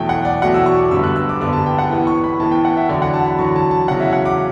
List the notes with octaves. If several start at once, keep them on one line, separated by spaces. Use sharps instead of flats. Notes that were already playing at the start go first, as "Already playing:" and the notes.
Already playing: E2 B2 F#3 A3 G5
F#5
D5
E2 B2 F#3 A3 F#5
E6
C#6
D6
G2 D3 G3 B3 E6
F#6
E6
D6
G2 D3 G3 B3 D6
A5
G5
F#5
A2 E3 B3
C#6
B5
A2 E3 B3 A5
G5
F#5
E5
E2 D3 F#3 D5
F#5
A5
B5
E2 D3 F#3 C#6
A5
A5
E2 C#3 F#3 F#5
E5
F#5
D6